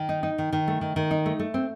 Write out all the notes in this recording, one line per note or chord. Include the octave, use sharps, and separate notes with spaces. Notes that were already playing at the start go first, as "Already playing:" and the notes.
Already playing: D#3
D#4
D#4
D#3
D#3
A3
D#3
D#3
D#4
A3
A3
C4